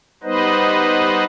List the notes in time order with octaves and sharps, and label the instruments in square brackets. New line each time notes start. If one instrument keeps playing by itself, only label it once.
[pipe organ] G3 B3 D#4 B4 C5 D#5